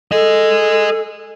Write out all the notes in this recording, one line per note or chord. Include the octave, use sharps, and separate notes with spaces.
G#4 A4 D#5